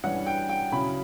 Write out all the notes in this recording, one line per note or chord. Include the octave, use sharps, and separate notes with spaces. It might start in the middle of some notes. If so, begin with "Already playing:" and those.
G2 E3 G3 C#4 F#5
G5
G5
C#3 F#3 C#4 E4 B5